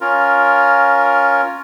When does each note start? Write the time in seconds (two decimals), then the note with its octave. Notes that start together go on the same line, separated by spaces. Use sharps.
0.01 C#4 F4 A#4